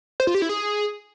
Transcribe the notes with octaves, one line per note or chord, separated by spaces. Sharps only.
C5
F4
G4
E4
G#4